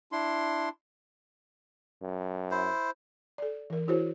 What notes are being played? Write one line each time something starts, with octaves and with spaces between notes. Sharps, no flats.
D4 E4 C6
F#2
E4 C5
A4 D5
E3 A#4
E4 F#4 G#4 C5 C#5